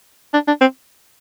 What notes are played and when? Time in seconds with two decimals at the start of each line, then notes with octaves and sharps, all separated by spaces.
0.34 D4
0.48 D4
0.61 C4